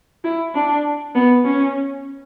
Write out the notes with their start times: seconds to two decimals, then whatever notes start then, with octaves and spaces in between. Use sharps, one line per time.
0.24 E4
0.55 D4
1.15 B3
1.45 C#4